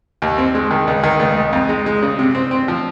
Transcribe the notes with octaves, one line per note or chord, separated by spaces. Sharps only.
D#2
C4
G#3
D#3
C#2
D#3
C#2
C#2
F2
G#3
G#3
C#3
C3
C4
C4
F3